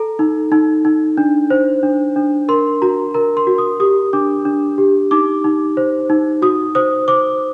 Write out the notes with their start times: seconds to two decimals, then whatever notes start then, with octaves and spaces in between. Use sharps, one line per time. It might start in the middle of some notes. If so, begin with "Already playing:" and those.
Already playing: A4 A#5
0.19 D#4
0.52 D#4
0.85 D#4
1.17 D4
1.50 C5
1.83 D4
2.16 D4
2.48 A#4 C6
2.82 F#4 A#5
3.14 A#4 A#5
3.37 C6
3.47 F#4
3.58 D#6
3.80 G4 D#6
4.13 D4 D6
4.45 D4
4.78 G4
5.11 D#4 D6
5.44 D#4
5.77 C5
6.10 D#4
6.42 F#4 D#6
6.75 C5 D#6
7.08 C5 D6